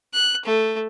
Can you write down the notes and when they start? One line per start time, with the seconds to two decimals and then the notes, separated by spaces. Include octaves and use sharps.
0.13 F#6
0.45 A3